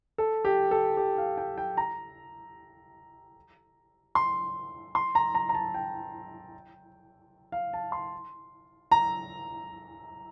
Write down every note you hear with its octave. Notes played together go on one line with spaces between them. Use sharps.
A4
G4
A4
G4
F5
G5
G5
A#5
C6
C6
A#5
A#5
A#5
A5
G5
F5
A5
C6
A#5